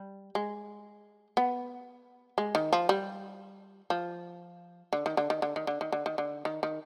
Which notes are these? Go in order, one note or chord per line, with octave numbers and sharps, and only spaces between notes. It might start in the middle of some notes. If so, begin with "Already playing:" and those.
Already playing: G3
G#3
B3
G#3
D#3
F3
G3
F3
D3
D#3
D3
D#3
D3
D#3
D3
D#3
D3
D#3
D3
D#3
D#3